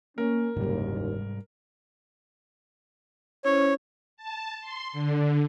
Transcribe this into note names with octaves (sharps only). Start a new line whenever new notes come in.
A#3 C#4 A#4
F#1 D#2 G#2 C3 G3
C#4 E4 C5 C#5
A5
C6
D3